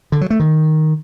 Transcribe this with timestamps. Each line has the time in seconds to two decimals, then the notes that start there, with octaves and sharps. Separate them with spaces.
0.12 D3
0.21 F#3
0.30 A3
0.40 D#3